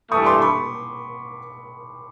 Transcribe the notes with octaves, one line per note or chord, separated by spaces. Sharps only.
G2 E3 A3 C#6 D#6
C6 D6
B5 C#6